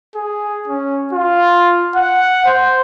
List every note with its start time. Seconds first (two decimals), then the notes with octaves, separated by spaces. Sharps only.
0.15 G#4
0.68 C#4
1.13 F4
1.96 F#5
2.46 C5